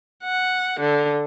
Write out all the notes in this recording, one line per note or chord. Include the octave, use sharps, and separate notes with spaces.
F#5
D3